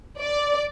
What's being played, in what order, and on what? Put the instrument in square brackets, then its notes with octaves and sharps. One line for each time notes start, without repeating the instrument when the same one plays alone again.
[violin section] D5